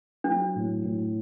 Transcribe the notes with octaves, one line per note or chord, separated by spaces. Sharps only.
F#3 D4
A2
A2